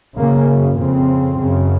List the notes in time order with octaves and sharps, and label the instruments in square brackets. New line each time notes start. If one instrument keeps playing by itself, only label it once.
[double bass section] F#2 C#3 A#3
F2 C#3 C4
F#2 C#3